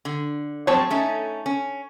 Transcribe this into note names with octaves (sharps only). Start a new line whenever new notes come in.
D3
F3 F#3 C4 C#5 A5
A3 C#4 D#4
C#4